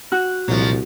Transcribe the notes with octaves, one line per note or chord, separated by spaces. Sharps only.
F#4 F#6
C2 A#2 F3 F#3